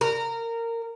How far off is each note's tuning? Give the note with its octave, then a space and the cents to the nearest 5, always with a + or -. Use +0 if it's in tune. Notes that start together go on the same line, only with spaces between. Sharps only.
A#4 -15